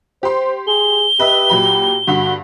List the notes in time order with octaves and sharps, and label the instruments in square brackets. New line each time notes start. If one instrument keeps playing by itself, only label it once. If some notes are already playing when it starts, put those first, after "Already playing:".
[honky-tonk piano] G4 C6 [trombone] C5
[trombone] G#4 [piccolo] G7
[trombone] G4 [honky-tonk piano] B4 D#5 E5
[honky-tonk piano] A#2 F#3 B5
[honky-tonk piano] G2 D3 B6 [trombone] F#4